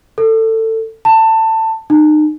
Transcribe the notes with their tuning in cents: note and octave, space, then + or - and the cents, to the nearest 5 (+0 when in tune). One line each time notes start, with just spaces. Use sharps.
A4 +20
A5 +20
D#4 -35